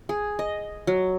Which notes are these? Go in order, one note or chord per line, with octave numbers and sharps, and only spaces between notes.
G#4
D#5
F#3